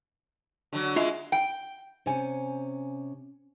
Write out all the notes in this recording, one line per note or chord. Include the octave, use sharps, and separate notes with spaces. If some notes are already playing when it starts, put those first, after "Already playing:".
D3 F#3
G#3 F4 E5
G5
C3 C#4 G#5